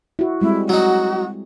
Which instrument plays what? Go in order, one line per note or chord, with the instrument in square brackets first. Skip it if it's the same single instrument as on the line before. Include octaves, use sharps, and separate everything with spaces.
[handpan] E4 F#4
[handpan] G3 G#3 C4 [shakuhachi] E4
[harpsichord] F#3 D#4 [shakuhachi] F#4